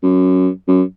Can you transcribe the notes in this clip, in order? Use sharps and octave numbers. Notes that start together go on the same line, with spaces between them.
F#2
F#2